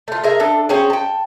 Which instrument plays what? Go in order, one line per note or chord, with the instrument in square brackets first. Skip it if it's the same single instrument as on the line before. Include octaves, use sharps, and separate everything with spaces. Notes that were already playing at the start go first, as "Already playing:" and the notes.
[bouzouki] A3 F4
G#4 A#4 E5
D4 A4
C4 C#4 F#4 G#4
G5 A5